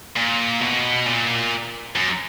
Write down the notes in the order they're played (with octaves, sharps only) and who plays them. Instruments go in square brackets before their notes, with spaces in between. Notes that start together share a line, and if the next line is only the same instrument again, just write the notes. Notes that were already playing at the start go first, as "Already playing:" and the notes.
[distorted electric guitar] A#2
B2
A#2
F#2